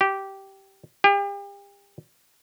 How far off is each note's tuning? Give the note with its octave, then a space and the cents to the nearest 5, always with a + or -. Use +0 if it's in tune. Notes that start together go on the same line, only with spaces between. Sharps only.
G4 -10
G4 +40